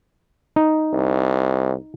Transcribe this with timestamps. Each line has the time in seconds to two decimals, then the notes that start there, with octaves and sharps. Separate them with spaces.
0.56 D#4
0.93 C2